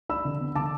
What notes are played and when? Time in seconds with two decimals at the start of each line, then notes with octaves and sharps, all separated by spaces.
0.09 D4 B5 E6
0.25 D3
0.41 B3
0.55 D3 A5 D6